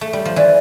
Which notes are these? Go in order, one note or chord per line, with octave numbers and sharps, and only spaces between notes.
A3
G3
F3
E3 D5